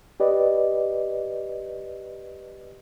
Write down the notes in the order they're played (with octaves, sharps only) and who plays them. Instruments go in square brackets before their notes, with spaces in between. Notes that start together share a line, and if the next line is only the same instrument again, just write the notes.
[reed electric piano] G4 B4 D5 D#5